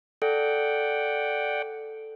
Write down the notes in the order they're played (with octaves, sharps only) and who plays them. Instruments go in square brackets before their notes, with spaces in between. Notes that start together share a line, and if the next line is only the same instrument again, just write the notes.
[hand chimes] A4 [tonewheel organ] D5 F#5 G5